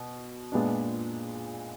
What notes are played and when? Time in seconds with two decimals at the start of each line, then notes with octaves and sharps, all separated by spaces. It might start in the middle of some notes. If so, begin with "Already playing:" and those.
Already playing: B2
0.52 A#2 G#3 B3 D4